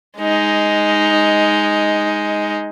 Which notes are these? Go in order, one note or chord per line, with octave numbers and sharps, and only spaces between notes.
G#3 D#4